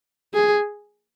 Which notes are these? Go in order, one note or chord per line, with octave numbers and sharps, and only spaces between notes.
G#4